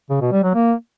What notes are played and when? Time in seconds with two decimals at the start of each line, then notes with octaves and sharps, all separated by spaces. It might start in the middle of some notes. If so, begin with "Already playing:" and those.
0.10 C#3
0.21 B2
0.32 G3
0.43 F#3
0.54 A#3